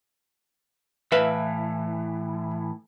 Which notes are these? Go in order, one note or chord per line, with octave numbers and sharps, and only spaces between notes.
A2 E3 B4 E5 F5